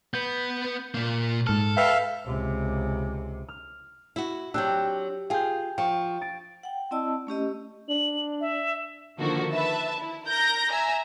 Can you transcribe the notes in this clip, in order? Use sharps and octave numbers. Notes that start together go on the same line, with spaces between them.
B3 B4 G6
A#2 A#3
G#2 A4 F6
B4 E5 F5 G5
C#2 C3
F6
E4 F#4
F#3 C4 D4 G4 G5 E6 F#6
F4 G#4 F5 G5 G6
F3 G5 C#6
A6 D7
F#5 G5
C4 E4 D5 D#5 A5 E6
A3 C#4 G4 D#5
D4 F#7
E5
D3 D#3 F3 A#3 F#4 A4
B4 E5 A5
E4
A#4 G6 A#6
E5 G#5 A#5